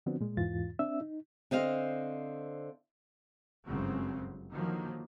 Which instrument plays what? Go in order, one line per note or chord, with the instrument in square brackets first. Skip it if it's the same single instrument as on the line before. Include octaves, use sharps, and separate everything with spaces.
[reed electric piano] D3 F3 B3 C4 D4 F#4
A#2 G#3
E2 G#2 E3 F4 A6
C4 D4 E5 E6
D#4
[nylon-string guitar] D3 C4 D#5 F5
[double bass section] G1 F#2 C#3 G#3 C4
D3 D#3 F3 F#3 A#3